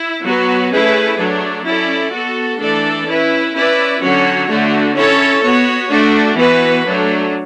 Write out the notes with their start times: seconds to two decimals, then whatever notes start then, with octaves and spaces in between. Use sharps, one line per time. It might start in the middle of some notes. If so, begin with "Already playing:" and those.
Already playing: E4
0.24 F#3 B3 F#4 B4
0.72 A3 C#4 E4 G#4 B4
1.18 F#3 A3 D4
1.66 C#4 E4 A4 D5
2.13 B3 F#4 A4
2.60 E3 A3 D4 A4 D5
3.08 C#4 E4 B4
3.54 C#4 E4 B4 D5
4.01 D3 F#3 C#4 F#4 C#5
4.49 D3 A3 D4 F#4
4.96 C#4 E4 A4 C#5
5.43 B3 F#4 C#5
5.90 A3 D4 F#4
6.38 E3 B3 F#4 B4
6.85 F#3 A3 D4